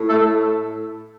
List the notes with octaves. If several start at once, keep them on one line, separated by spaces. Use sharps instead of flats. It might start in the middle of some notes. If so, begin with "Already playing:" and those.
Already playing: A2
A3 A4